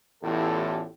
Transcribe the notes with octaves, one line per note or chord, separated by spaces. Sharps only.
A1 E2 A2 F4 G4 A4